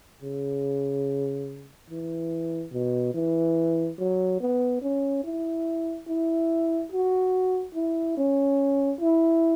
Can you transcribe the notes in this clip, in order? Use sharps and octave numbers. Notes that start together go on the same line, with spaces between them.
C#3
E3
B2
E3
F#3
B3
C#4
E4
E4
F#4
E4
C#4
E4